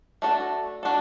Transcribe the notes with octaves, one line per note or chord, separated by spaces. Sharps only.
A3 D4 F#4 A4
D4 F#4 A4